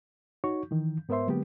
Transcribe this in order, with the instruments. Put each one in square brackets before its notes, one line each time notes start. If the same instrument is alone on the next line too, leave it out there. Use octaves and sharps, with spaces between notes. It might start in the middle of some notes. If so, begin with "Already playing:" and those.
[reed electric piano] D#4 F#4 C#5 C#6
D#3 E3
G#2 B3 A#4 C5 E5 C6
D3 F#3 G#3 A#3 B3 G4